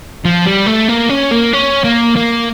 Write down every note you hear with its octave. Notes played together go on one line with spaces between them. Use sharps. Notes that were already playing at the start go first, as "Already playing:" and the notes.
F3
G3
A3
A#3
C#4
A#3
C#4
A#3
A#3